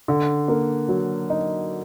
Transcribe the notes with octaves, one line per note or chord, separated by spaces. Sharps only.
D3
A#3
F#3
D#4